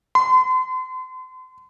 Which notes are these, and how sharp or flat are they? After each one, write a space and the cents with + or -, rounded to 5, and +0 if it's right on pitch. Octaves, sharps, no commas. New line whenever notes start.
C6 -40